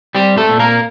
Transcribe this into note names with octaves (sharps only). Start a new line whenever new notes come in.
G3 C4 G4
A3 A4
A#2
A#3 A#4